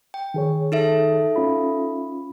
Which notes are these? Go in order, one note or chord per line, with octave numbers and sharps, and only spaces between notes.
G5
D#3 G#4 C#5
D#4 A4 E5
C#4 F4 B5